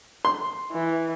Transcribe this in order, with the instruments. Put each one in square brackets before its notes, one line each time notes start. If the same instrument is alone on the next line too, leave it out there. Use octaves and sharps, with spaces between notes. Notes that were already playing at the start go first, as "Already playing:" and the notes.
[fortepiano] C6
[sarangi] E3